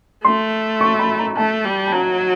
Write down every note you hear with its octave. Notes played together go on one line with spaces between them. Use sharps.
A3 C6
C#6
B5
A#5
A3 A5
G3
A5
F#3 A#5